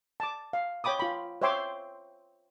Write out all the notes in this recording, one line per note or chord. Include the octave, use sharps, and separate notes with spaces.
A5 D6
F5
C#5 G5 B5 D6 D#6
F4 B5
C5 C#5 E5 G5 C6 D6